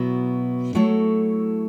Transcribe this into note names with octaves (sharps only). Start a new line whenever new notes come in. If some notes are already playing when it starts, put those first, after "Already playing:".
Already playing: B2 F#3 B3 E4
F#3 A3 E4 A4 C#5